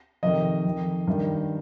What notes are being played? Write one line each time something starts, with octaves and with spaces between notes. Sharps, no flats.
F2 C3 D#3 D#5
F2 D#3
G2 D#3